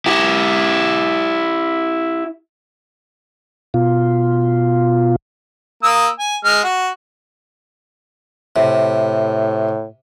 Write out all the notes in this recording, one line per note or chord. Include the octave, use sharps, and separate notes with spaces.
E4 G4
B2 F4
A#3 D#6 E6
G#5
G#3 F6
F#4
A2 C3